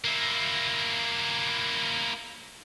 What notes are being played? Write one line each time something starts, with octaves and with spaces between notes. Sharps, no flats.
A#3 E4